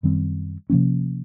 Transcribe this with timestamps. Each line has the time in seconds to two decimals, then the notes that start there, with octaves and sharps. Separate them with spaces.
0.03 F#2 D#3 G3 C4
0.70 C3 F3 A#3 C#4